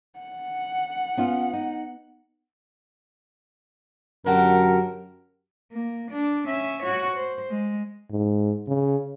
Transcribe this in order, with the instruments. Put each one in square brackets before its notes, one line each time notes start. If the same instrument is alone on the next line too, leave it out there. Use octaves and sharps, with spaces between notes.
[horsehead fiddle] F#5
[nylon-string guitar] B3 C#4 F4
D#4
[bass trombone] F#2 [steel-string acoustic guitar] D3 F#4 G4 [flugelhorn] A#4
[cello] A#3
D4
C#4 E5
F#4 C#5
C5
G#3
[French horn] G#2
C#3